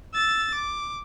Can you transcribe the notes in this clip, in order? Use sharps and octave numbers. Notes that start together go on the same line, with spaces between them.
E6 A6
D6